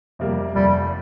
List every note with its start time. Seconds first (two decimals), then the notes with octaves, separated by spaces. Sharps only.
0.19 F2 C3 G3 A#3
0.55 F1 G3